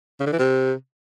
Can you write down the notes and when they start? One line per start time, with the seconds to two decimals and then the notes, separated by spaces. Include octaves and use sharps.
0.20 C#3
0.26 D3
0.33 E3
0.39 C3